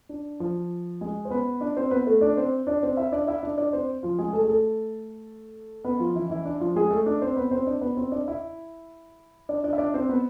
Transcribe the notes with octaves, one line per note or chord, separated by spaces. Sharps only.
D4
F3 F4
G#3 G#4
C5
B3 B4
D4 D5
C4 C5
B3 B4
A3 A4
D4 D5
C4 C5
D4 D5
C4 C5
E4 E5
D4 D5
E4 E5
D4 D5
D4 D5
C4 C5
F3 F4
G#3 G#4
A3 A4
G#4
A3 A4
B3 B4
F3 F4
E3 E4
E3 E4
D4
F3 F4
G#3 G#4
A3 A4
D4 D5
C4 C5
B3 B4
C4 C5
D4 D5
B3 B4
C4 C5
D4 D5
E4 E5
D4 D5
D4 D5
E5
D4 D5
C4 C5
B3 B4